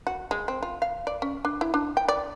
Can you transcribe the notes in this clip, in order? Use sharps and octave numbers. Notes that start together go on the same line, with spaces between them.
F#4
G#3
C4
F4
F5
D5
C#4
D4
E4
D4
G5
D5